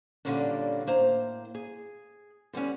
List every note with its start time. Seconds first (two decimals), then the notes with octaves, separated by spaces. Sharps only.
0.25 A#2 D3 G3 A#3 C#4 D4
0.87 A2 A#3 C5 A#5
1.55 G#4
2.53 D3 G3 B3 C#4